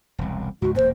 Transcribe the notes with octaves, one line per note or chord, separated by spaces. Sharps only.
E1 C2
C#2 G#2 F#4
E1 F#2 A#3 C5